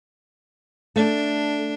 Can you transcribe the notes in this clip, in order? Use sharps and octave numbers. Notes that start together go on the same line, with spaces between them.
A3 D4